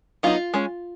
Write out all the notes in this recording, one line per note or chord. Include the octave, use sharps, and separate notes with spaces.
F#3 B3 D#4 F4
G#3 C#4